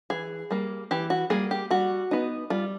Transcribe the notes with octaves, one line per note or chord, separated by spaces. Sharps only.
E3 G#4
G3 A#3
E3 G4
F#4
G3 A#3 G#4
G4
G3 F#4
B3 D#4
G3 F4